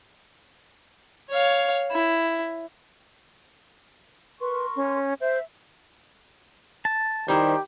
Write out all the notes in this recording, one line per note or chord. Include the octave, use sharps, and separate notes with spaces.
C#5 F5
E4
A#4 B4 C6 C#6
C#4
C5 E5
A5
D#3 G3 D#4 E4 G4 C5